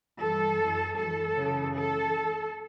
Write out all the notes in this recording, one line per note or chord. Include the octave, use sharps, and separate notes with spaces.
G2 E3 A4
F#2 E3
F#2 E3 A4
F#2 C#3 E3
E3 A4